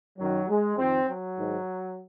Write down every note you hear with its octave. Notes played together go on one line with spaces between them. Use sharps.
F#2 D#3 F#3
G#3
F2 D#3 C4
F#3
G#2 D#3